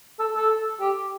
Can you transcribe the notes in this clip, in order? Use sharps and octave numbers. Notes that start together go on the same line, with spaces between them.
A4
A4
G4